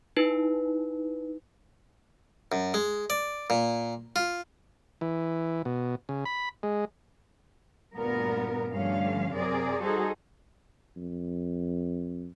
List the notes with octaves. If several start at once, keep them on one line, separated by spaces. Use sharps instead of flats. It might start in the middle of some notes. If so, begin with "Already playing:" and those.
D#4 E4 B4
F#2
G#3
D5
A#2
F4
E3
B2
C#3
B5
G#3
D2 G2 A#2 B3 A#4
G2 D3 F3 A3 C#4 F5
F#2 C3 C4 G#4 A#4 D5
G3 D#4 F#4 G#4 A4 C5
F2